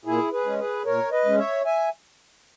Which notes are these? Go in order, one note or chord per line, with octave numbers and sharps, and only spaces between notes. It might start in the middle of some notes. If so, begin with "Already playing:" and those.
A#2 E4 G#4
G#4 B4
G#3 C#4
G#4 B4
A#2 A#4 C#5
B4 D#5
G#3 C#4
C#5 E5
E5 G#5